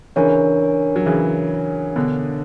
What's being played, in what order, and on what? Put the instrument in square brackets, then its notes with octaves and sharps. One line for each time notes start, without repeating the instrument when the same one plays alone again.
[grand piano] C#3 E3 [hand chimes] D4 A#4 C#5
[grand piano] F#3
C#3 E3
B2 D3